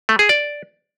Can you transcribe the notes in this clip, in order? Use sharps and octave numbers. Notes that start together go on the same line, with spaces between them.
A3
G#4
D5